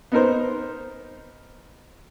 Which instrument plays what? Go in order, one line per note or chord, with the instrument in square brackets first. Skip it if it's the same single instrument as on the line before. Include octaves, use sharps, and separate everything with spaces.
[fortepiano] B3 D#4 A#4 C5